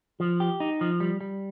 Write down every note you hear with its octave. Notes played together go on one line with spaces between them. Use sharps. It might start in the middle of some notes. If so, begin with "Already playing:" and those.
F3
G4
D#4
F3
G3
G3